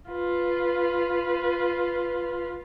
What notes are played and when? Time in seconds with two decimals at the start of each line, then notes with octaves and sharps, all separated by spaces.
0.10 F4 B4